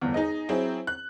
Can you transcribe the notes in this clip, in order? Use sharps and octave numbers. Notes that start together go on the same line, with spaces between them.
G1 E2
D#4 G#4 D#5
F#3 C4 E4 G#4
F#6